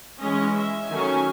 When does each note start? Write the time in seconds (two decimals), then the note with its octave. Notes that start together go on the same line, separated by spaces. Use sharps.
0.22 E3 G#3 C#4 D#5
0.56 E5
0.90 D#3 F#3 A3 C#4 G#5